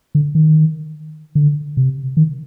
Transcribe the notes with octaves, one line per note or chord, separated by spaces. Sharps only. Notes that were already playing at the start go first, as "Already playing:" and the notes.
D3
D#3
D3
C3
D#3